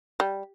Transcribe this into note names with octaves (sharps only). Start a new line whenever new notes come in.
G3